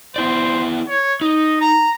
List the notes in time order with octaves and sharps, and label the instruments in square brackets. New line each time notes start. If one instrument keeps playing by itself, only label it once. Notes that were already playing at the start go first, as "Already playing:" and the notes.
[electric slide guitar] B3 E4 D5 [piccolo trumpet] C5
[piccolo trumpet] C#5
[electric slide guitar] D#4 [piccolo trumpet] D#5
[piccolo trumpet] A#5